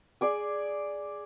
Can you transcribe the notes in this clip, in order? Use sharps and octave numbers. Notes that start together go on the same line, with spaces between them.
G#4 D5 G#5